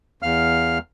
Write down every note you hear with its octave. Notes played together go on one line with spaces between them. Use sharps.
E2 F5 F6